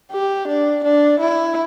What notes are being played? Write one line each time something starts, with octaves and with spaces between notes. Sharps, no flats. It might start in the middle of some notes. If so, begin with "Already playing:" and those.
G4
D4
D4
E4